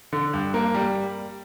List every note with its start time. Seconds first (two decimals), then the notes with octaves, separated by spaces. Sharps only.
0.13 D3
0.33 G2
0.54 A#3
0.74 G3